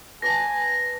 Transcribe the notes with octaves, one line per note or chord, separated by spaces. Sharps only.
B4 D5 G#5 A5 A#6